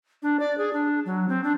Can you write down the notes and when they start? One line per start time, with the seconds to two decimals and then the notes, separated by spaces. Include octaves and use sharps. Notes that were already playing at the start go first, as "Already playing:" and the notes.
0.23 D4
0.40 D5
0.58 G#4
0.73 D4
1.06 F#3
1.29 C4
1.44 D4